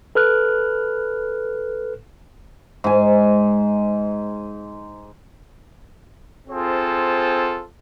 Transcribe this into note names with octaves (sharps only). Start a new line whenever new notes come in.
A4 B4 F6 F#6
G#2 G#5
C4 F4 G#4 A4 C5